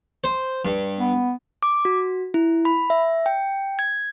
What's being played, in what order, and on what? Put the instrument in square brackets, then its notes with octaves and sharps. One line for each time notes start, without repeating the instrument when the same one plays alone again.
[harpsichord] C5
G2
[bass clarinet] B3
[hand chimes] D6
F#4
E4
B5
E5
G5
G#6